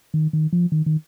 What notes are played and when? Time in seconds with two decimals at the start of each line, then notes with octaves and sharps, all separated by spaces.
0.14 D#3
0.33 D#3
0.53 F3
0.72 D#3
0.86 D#3